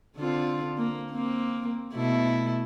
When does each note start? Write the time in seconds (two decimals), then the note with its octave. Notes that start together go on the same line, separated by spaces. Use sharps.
0.17 D3 C4 F4
0.77 A#3
1.11 A#3 C4
1.94 B2 A3 E4